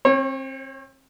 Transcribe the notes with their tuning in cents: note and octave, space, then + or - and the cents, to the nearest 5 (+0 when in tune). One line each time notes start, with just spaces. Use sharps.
C4 +30 C#5 -30